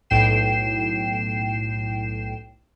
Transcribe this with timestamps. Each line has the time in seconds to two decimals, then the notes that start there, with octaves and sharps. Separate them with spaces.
0.10 B1 A2 G5 C7 E7